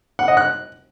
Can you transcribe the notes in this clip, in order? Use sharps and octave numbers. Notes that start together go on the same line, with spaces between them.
F#5
D#5
F#6